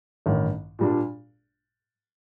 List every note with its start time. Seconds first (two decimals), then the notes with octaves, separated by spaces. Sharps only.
0.26 A1 G2 D#3
0.79 A#2 G3 D4